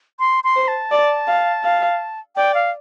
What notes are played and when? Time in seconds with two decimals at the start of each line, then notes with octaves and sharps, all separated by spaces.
0.20 C6
0.44 C6
0.56 C5
0.68 A5
0.91 D5
1.27 F5
1.64 F5
2.36 D5 G5
2.54 F5